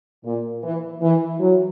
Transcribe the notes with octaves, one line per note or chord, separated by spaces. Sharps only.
A#2
E3
E3
F#3